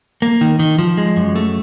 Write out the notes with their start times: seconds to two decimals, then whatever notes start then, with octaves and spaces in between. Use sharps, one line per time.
0.22 A#3
0.41 D#3
0.59 D#3
0.79 F3
0.97 G#3
1.16 F#2
1.36 A3